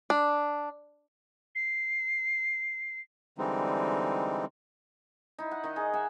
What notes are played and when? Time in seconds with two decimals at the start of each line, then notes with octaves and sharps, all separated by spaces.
0.10 D4
1.55 C7
3.38 D3 E3 G3 G#3 C4 D#4
5.38 D#4 E4
5.51 F#5
5.64 D#3 D#5
5.76 D#4 G#4
5.93 D#5 E5 F#5 G#5